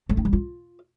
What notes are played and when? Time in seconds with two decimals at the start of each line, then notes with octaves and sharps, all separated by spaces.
0.09 A3
0.17 D#4
0.25 G3
0.33 F4